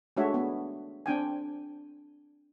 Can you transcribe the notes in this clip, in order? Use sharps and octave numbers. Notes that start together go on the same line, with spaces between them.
G#3 A3 D4 F#4 C#5 E5
B3
C4 D4 G5 G#5